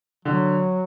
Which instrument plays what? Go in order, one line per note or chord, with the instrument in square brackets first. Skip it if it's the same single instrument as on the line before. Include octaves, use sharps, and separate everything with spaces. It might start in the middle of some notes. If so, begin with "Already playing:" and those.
[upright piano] D3 [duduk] F#3